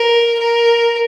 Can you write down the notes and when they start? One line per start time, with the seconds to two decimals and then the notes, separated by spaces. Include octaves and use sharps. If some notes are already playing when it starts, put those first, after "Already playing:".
Already playing: A#4
0.39 A#4